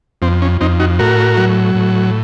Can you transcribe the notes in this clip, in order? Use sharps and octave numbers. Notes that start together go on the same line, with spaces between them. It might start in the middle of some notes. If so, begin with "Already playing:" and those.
F2 C4
C#4
F2 C4 D#4
D#4 F#4
A2 F#4 A#4
F#3
A2